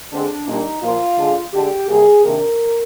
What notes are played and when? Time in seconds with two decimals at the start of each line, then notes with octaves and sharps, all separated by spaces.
0.12 D3 G#3 C4 D4
0.47 A#2 G3 A#3 D4 D#4
0.82 A#2 F3 A#3 F4
1.17 D3 G#3 D4
1.52 D3 G#3 D4 G4
1.88 C3 G3 A#3 G#4
2.23 C3 D#3 A#3 D4 A#4